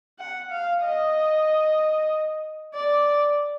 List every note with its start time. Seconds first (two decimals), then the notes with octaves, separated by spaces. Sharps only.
0.19 F#5
0.51 F5
0.83 D#5
2.74 D5